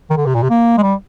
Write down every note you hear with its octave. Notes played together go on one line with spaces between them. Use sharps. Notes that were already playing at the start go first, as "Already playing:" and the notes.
D#3
D3
C3
A#2
C3
A#3
G#3
G3